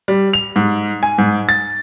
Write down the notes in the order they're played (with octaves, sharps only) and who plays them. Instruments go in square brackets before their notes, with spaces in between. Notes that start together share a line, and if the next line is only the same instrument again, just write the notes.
[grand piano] G3
F7
G#2
G#5
G#2
A6